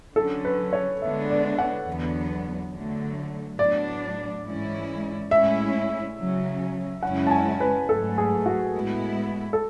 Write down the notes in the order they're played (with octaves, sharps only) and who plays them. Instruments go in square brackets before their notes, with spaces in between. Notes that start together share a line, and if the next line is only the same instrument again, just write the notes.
[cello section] D3 F#3 C#4 [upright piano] A4
[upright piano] B4
C#5
[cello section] D3 G#3 B3 D4 [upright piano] E5
[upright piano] D5
F#5
[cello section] E2 D3 F#3 B3
D3 F#3 A3
[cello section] A2 F#3 B3 D4 [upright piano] D5
[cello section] G#2 E3 G#3 C#4 E4
[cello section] A2 G#3 C#4 E4 [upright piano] E5
[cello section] C#3 F#3 C#4
[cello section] F#2 C#3 G#3 C#4 E4 [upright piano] F#5
[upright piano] A5
G#5
B4
[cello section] G#2 F#3 A3 [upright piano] A4
[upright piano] G#4
F#4
[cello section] A2 G#3 B3 E4
[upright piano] A4